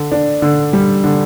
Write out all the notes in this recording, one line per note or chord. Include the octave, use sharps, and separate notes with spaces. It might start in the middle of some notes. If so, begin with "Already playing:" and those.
Already playing: D3
D4
D3
G3
D3